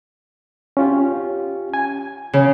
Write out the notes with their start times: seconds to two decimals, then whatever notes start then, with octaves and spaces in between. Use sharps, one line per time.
0.77 C#4 F4 G4
1.74 G#5
2.33 C#3